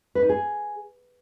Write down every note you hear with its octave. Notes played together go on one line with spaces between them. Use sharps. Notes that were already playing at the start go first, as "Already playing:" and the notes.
B4
D#4
G#4